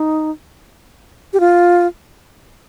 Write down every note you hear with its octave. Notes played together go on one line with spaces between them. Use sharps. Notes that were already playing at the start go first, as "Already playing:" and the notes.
Already playing: D#4
G4
F4